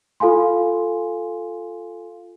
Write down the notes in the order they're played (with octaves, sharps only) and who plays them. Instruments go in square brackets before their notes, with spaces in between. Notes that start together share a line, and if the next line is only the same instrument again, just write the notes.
[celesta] F4 A4 F5 G#5 C6